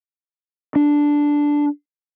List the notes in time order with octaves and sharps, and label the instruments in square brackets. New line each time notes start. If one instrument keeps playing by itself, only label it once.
[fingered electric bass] D4